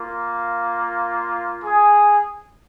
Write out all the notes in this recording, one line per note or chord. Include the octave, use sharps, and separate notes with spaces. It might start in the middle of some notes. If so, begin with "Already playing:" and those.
Already playing: A#3 F4
G#4